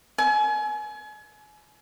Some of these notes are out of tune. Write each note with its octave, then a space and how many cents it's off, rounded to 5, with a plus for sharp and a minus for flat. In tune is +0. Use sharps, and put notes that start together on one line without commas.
G#5 +35